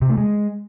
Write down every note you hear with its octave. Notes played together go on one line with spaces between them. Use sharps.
C3
A3
G#3